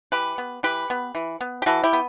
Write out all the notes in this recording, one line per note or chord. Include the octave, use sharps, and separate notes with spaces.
E3 G4 B4
B3
E3 G4 B4
B3
E3
B3
G4
E3 F#4 A4
E4 G4
B3